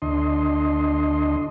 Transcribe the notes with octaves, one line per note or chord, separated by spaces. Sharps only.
D2 D4 D#5 C6